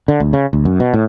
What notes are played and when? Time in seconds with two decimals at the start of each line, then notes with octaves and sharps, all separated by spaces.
0.08 D3
0.20 D2
0.33 C#3
0.53 D2
0.65 F#2
0.80 B2
0.93 A2